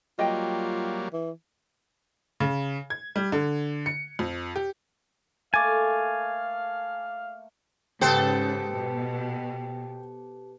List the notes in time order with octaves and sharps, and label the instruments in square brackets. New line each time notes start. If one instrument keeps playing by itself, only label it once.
[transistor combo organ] F#3 G3 A#3 [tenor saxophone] F4 [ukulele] D#5 G5
[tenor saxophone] E3
[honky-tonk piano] C#3
G#6
G3
D3
C#7
F2
G4
[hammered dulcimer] A3 A#3 [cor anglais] F5 [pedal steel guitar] G#5 [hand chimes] D6 A6
[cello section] G#2 C#3 [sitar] B3 A4 C5 [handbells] G4 A5 [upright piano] G5
[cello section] B2